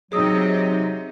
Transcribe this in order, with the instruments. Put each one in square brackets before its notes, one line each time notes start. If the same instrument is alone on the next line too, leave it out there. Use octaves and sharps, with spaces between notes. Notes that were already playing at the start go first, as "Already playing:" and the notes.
[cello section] C3 C4 D#4 [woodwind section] F#3 [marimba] G#4 D#6 E6